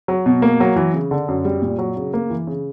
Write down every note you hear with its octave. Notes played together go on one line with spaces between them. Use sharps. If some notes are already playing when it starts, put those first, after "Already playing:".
F#3
B2
A#3
F#3
E3
C#3
D3
F#2
G3
A#2
F#3
C#3
A#3
E3
C#3